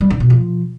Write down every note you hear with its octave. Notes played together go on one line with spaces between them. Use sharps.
G3
D3
B2
F3